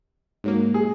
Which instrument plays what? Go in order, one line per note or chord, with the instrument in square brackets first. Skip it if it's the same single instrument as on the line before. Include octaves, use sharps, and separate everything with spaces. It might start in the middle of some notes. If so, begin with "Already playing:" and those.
[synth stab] G#2 F#3 A#3
[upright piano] G#4